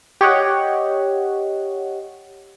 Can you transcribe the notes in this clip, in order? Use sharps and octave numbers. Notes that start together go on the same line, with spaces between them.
G4 C#5 D#5 F#5